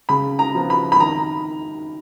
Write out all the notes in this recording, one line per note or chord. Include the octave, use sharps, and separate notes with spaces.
C#3 B5
A#5
F3 B3
B5
B5
D#3 A#5